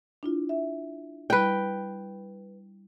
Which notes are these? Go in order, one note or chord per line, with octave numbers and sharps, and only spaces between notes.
D4 E4 F4
E5
G3 E4 B4 G5